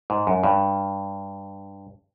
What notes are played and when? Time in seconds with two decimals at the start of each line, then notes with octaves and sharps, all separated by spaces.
0.10 G#2
0.27 F#2
0.44 G2